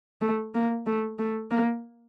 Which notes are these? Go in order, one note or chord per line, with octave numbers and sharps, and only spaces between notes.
A3
A#3
A3
A3
A#3